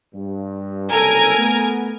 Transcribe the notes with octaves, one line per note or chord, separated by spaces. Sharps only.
G2
F#1 C2 A4 A#4 G#5 G#6
A3 B3